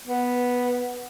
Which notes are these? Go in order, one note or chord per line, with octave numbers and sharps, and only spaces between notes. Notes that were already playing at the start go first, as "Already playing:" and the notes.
B3